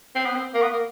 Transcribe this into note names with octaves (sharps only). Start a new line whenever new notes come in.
C4
B3
C4
A#3
B3
A#3